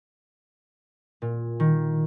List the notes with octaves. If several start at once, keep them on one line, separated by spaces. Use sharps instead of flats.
A#2
D#3